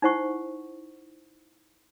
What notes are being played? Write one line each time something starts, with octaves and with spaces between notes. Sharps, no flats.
D#4 E4 C5 F#5 C#6